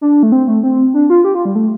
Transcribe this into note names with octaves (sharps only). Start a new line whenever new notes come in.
D4
A3
C4
A3
C4
D4
F4
G4
F4
G3
A3